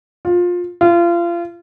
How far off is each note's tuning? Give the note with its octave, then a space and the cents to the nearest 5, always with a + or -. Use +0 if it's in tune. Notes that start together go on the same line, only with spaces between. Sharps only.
F4 +20
F4 -30